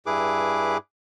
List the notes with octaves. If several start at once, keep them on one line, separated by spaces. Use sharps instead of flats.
G2 E4 G#4 B4 D6